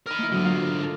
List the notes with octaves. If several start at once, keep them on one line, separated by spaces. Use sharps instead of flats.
A#4 D#5 B5 D#6 F6
A#3 E4
G#2 D3 F#3 D#6
F4 A#4 F5
A4 A#4